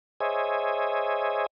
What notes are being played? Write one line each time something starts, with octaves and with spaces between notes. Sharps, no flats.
G#4 C5 C#5 D#5 E5 G#5